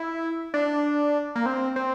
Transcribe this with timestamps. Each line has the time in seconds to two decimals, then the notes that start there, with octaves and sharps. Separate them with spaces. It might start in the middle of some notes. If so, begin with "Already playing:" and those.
Already playing: E4
0.54 D4
1.35 A#3
1.46 C4
1.76 C4